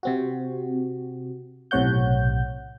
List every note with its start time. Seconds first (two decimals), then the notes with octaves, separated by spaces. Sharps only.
0.03 C3 C4 F#4
1.71 B1 A2 C3 C#5 F#5 G6